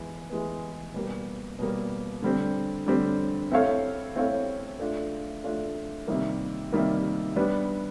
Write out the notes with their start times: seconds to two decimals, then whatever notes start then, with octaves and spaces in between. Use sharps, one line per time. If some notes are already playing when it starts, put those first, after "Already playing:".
Already playing: E3 G#3 B3
0.30 E3 G#3 B3
0.94 B2 G3 A#3
1.59 B2 G3 A#3
2.22 D3 G3 C4
2.86 D3 G3 C4
3.51 C4 E4 A4 C#5 F5
4.16 C4 E4 A4 C#5 F5
4.80 A3 D4 F4
5.44 A3 D4 F4
6.07 C3 D#3 G3 A#3
6.72 C3 D#3 G3 A#3
7.36 G3 B3 D4